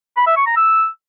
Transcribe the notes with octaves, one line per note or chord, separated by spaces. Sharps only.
B5
E5
C#6
A#5
E6